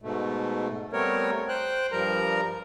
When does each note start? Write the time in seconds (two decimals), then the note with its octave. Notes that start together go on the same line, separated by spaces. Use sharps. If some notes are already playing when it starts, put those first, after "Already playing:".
0.02 G#2 B2 A3
0.93 G3 A3 B3 C4 A#4 C#5
1.49 C5 G5 F#6
1.92 G2 F3 G3 A#4 A#5